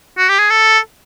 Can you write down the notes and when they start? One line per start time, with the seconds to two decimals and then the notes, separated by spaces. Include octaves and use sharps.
0.18 F#4
0.29 G4
0.39 G#4
0.50 A4